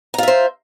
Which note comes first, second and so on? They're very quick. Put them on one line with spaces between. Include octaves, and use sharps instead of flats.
A#5 F4 E5 C5